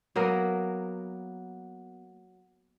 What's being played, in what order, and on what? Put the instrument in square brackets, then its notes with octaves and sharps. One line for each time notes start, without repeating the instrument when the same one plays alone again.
[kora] F#3 A#3 B3 A#4